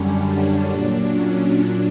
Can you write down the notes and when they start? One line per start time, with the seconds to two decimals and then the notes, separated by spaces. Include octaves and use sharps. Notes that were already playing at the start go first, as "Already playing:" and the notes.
Already playing: F#2 D3 G3 C#4
0.23 D4
0.68 A#2 F#3
1.14 C#4
1.58 A#2 F#3 D4